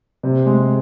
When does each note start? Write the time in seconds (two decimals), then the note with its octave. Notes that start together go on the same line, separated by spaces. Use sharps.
0.23 C3
0.46 G#3